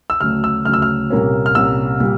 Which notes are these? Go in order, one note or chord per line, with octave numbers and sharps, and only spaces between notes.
E6
D2 C#3 F#3 A3 F6
E6
D2 C#3 F#3 A3 F6
E6
F6
C2 A#2 G3 A#3 C#4
F6
C2 A#2 G3 A#3 C#4 E6
A#2 G3